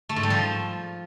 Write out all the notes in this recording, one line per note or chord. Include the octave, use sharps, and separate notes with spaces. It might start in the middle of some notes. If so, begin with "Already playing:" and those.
A3
G#2
G3
F3